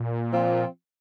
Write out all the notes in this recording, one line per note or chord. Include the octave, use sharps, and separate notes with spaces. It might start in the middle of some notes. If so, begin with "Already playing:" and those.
Already playing: A#2
F3 C4 F4